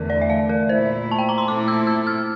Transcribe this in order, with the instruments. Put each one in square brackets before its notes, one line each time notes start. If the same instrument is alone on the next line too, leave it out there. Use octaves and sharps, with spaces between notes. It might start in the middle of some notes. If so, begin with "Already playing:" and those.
Already playing: [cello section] E2 D3 A3 [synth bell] A#4
[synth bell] D5
E5
F5
A#4
[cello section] A#2 A3 E4 [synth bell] C5
[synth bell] A5
G5
A#5
C6
[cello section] A#2 A3 C4 E4 A4 [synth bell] D6
[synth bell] E6
E6
F6